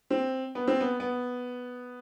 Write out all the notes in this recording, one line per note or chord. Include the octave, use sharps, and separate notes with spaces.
C4
B3
C4
B3
B3